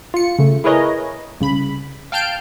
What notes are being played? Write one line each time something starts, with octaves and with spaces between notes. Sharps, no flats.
F4 C#7
C#3 A3
E4 G#4 A#4 B4 C#5 D#5
C2 C#3 B5
F5 G5 A5 F6 G6 D7